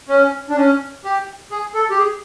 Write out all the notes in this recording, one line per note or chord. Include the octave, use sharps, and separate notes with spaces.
C#4
D4
C#4
G4
G#4
A4
G4
G#4